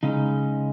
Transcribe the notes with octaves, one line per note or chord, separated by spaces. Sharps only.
C#3 G#3 C#4 D#4